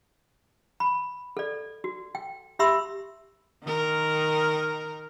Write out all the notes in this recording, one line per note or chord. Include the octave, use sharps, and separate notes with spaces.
B5
A4 D5
F#4
G5
G4 E5 B5 C6 E6
D#3 A#4